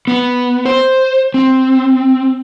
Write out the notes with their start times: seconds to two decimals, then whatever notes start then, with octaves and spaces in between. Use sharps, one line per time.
0.07 B3
0.65 C5
1.34 C4